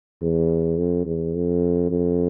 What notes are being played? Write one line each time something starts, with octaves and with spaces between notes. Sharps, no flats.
E2
F2
E2
F2
F2